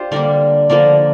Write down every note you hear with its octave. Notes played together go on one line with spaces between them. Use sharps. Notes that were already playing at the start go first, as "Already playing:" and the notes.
Already playing: D4 F4 G4 C5
D3 G3 A#3 A#4 D5
D3 F3 A#3 A#4 D5